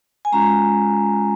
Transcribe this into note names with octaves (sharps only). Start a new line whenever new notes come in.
G#5
G#3 C#4 F4 A#5